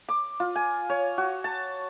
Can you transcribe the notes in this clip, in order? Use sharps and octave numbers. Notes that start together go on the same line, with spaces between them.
D6
F4
G#5
C#5
F#4
A5